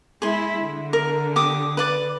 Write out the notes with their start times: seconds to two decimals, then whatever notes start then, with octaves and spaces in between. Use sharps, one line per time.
0.22 G#3 E4 G#4 C6
0.60 D3
0.93 A#4
1.36 G4 D6 D#6
1.77 B4 D5 D6